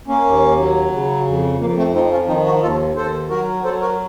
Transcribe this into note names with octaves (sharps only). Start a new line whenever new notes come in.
A#3 C#4
D#2
F#3
C#3
F2
F2 A#3
A3 C4
F3 C4 D#4
C#4 F4
D#3 C4 D#4
D#4 F#4
D#2 F4 A4
D#2 A4 C5
F#3 F#4 A#4
F#3 A4 C5
F#4 A#4